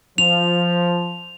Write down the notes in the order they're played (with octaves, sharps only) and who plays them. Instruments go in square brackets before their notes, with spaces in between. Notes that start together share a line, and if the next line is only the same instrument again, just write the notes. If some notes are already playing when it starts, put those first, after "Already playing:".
[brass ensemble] F3 [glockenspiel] F7